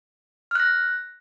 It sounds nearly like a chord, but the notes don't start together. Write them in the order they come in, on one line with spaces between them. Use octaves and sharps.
F6 F#6 A#6